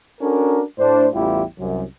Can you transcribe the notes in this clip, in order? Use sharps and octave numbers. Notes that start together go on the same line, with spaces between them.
C#4 D4 F#4 A4 A#4
A2 D4 C5
A1 E2 G3 E4 F4 G4
C2 F#2